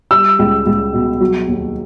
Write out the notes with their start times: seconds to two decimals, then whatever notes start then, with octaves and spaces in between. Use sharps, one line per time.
0.11 G3 E6
0.39 C#2
0.66 C#2
0.93 B2
1.21 F#3
1.48 D#2